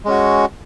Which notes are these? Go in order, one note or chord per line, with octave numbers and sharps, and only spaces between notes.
G#3 C#4 F#4